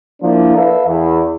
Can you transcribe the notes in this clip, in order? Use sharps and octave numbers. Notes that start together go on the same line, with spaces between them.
F3 A#3 D4 E4
A4 B4 E5 F5
E2